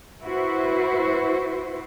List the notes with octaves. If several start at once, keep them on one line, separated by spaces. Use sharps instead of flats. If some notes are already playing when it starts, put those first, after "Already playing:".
E4 F#4 B4 C5